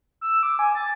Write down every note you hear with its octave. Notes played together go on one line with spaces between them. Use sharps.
E6
D6
G#5
A6